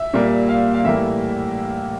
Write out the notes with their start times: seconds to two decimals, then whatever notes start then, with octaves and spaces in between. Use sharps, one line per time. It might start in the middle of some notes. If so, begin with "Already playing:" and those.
Already playing: E5
0.14 A#2 G3 A#3
0.49 F5
0.74 F5
0.84 A2 E3 G3 A#3 E5